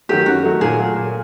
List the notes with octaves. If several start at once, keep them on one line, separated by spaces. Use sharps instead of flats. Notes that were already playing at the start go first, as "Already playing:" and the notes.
D#3 F#3 A3 G4
F#2 F#4
D#3 F#3 A3
A#2 G#4
F#3 A3
A#2